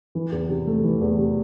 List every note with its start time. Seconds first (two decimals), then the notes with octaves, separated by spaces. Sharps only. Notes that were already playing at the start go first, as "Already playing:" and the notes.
0.15 E3
0.32 E2
0.49 C3
0.67 A3
0.84 E3
1.01 E2
1.19 C3